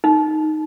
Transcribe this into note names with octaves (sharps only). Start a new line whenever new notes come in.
D#4